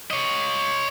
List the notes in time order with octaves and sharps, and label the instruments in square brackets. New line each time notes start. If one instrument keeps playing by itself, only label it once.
[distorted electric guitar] C#5 D#5